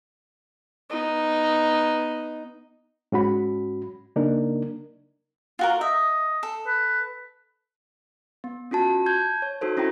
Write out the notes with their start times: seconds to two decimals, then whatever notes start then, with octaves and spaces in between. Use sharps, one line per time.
0.90 B3 D#4
3.12 G#2 C#4 F#4 B5
4.16 C#3 A#3 D4 D#4 A#4
5.59 F4 F#4 A#4
5.81 D#5 E5
6.43 A4
6.67 B4
8.44 B3
8.71 C#4 F4 F#4 A5
9.06 A5 G6 G#6
9.42 C#5
9.61 D#4 F#4 A4 C5
9.77 C#4 E4 F#4 A4 G5 A#5